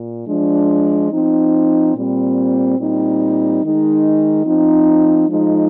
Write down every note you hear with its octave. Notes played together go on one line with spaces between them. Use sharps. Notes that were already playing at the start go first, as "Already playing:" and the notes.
Already playing: A#2
F3 G#3 D4
F3 C4 D#4
A#2 G3 C4
A#2 G3 C4 D#4
D#3 G#3 D#4
F3 C4 D#4
F3 G#3 D#4